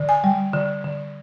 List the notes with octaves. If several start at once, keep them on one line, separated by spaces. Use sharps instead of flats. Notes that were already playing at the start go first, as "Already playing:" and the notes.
Already playing: D3
G#5
G3
D3
D3